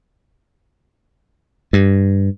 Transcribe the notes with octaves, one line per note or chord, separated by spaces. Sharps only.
G2